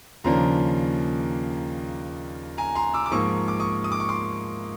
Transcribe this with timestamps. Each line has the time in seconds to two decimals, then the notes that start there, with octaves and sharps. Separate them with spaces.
0.24 D#2 C#3 F3 A#3 D4 A#5 C6
2.57 G#5 A#5
2.75 A#5 C6
2.94 D6 E6
3.06 D6
3.11 G#2 F3 A#3 C#6 D#6
3.48 D6
3.60 C#6 D#6
3.84 D#6
3.92 D6
4.00 C#6
4.09 C6 D6